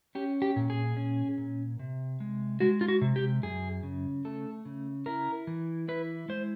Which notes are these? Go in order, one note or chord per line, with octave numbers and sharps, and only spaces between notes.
C#4 G4
G4
A#2
G#4
C#4
A#2
C3
G#3
G#3 F#4
F4
F#4
C3
G4
F#2 G#4
C#3
A3 A4
C#3
E4 A#4
E3
E4 B4
G#3 C5